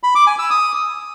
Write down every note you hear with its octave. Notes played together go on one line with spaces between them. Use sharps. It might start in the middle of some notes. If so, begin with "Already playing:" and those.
B5
D6
G#5
E6
D#6